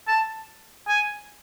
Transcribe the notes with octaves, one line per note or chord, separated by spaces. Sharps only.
A5
G#5